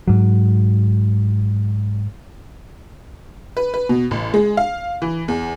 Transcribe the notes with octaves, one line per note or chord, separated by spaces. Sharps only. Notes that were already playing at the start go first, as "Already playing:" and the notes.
G#2 F#3
B4
B4
B2
A1
G#3
F5
E3
E2